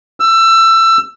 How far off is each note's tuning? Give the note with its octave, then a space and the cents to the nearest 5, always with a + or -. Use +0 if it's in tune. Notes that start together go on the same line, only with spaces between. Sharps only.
E6 +20